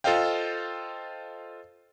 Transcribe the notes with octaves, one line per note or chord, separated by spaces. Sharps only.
F4 A4 C5 D#5 F5 G5